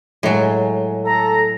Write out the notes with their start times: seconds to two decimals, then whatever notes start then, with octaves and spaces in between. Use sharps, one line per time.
0.23 A2 F#3 G#3 D#5 G#5
1.05 A4 A#5